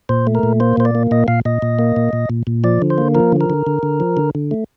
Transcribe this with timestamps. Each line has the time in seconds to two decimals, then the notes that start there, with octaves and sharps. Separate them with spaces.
0.09 A#2 C5
0.27 A3
0.35 A#4
0.43 A#2
0.60 A#3 C5
0.77 A#2 C5
0.85 D5
0.95 A#3
1.11 A#2 D#5
1.28 A#2 F5
1.45 A#2 D#5
1.62 A#2
1.79 A#3
1.96 A#2
2.13 A#2
2.30 A#2
2.47 A#2
2.64 F3 D5
2.82 D3
2.90 C5
2.98 A#3
3.15 F3 A#4
3.32 D3
3.41 A#4
3.50 D3
3.67 D3
3.83 D3
4.00 F3
4.17 D3
4.35 D3
4.51 A3